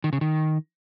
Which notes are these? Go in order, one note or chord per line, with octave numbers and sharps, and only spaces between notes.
D#3
C#3
D#3